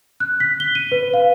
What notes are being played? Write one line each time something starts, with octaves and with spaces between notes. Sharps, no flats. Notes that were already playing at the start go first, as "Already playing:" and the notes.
F#6
B6
G7
D#7
B4
F5